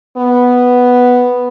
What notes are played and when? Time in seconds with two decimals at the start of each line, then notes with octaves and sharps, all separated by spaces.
0.17 B3